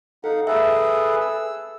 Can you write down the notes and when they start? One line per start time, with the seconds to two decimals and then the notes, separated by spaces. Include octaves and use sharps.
0.24 D#4 A4 F5 F#5
0.47 G#4 A4 B4 E5
1.20 E6